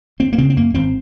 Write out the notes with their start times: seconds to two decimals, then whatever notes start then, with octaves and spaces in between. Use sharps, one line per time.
0.19 G#1 C4
0.33 A#3
0.38 C#3 C4
0.50 C4
0.56 F#2 A#3
0.74 G#1 C4